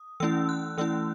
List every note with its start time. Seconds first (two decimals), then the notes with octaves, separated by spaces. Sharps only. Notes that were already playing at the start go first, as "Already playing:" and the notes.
Already playing: D#6
0.20 E3 A3 C#4 E4 E6
0.49 F#6
0.78 E3 A3 C#4 E4 E6